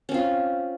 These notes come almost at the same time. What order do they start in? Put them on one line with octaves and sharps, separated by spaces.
C#4 C4 F4